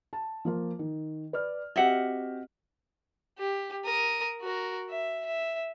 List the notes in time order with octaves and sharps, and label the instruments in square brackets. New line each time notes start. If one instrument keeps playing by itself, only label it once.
[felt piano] A5
F3 A#3 F4
D#3
B4 D5 F6
[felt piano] C4 F#4 G4 [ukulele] D#5 E5 F#5
[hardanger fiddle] G4
A#4 D#6
F#4 A#4
E5
E5